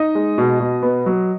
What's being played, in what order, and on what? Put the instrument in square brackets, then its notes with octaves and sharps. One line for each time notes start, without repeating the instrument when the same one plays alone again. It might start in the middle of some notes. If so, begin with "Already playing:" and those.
Already playing: [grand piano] D#4 D#5
G#3
B2
B2
B3
F#3